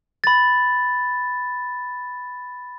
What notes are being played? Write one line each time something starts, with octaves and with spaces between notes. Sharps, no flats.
B5 A6